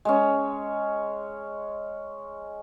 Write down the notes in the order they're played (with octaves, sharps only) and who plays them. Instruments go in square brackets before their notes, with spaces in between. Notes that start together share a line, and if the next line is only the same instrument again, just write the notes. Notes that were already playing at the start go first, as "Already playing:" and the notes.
[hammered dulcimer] G#3 C#4